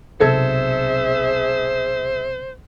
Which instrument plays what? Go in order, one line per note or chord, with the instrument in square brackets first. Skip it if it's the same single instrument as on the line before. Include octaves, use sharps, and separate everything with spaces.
[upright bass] B1 C3 [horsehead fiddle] G#4 E5 [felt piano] A4 G#6 [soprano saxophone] C5